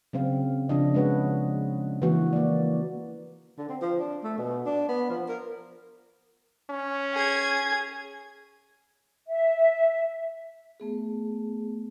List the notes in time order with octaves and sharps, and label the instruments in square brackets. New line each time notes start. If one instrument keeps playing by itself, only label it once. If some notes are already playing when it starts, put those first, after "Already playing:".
[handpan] C#3 F#3 C4 F5
C#3 F3 D4 D#5
G#3 F#4 B4 C#5 F#5
E3 A#3 F#4
A#3 D5
[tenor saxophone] D3
C4
F3
D4
A3
B2
D4
B3
F3
A#4
[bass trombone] C#4
[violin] G#4 G#6
[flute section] E5
[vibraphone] A3 B3 G#4